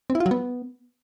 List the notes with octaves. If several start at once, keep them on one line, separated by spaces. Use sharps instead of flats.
C4
E4
F4
F#3
B3